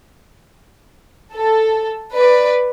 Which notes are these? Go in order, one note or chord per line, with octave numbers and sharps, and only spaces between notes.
A4
B4 D5